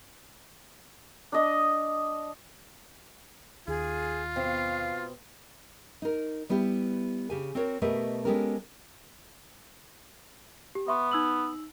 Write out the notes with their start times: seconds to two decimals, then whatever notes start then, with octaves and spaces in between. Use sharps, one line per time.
1.32 D4 D#5
3.68 D#2 F4 G#4
4.36 B2 C4 F5
6.02 D#4 A#4
6.49 G3 B3 E4 G4
7.30 C#3 G4 G#5
7.55 C4 F#4 A#4 C#5
7.82 B2 A3 G4 A#4 B4 D#5
8.25 G#3 B3 C#4 G4 A4 A#4
10.75 G4
10.88 B3 E5 C6 C#6
11.11 D#4 E6 F#7